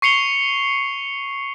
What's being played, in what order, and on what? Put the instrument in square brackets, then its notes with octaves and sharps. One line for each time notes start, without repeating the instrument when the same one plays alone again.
[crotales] C#6 C7 C#7 F7 G7